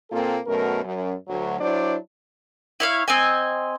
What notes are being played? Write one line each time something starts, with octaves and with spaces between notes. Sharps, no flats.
A#2 A#3 C4 F4 A4
F#2 B2 A3 A#4
F#2
D2 F#3
F#3 D4 E4 C5 D5
E4 C#5 F5
C4 D#5 G#5